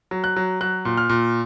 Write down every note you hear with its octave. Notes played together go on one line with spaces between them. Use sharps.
F#3
F#6
F#3
F#3 F#6
A#2
F6
A#2